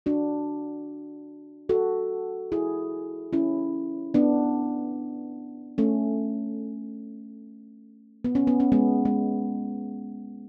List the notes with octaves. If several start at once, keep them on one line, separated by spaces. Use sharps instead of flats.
D4 F#4
F#4 A4
E4 G#4
C#4 E4
B3 D4
A3 C#4
B3
C#4
B3
C#4
G#3 B3
G#3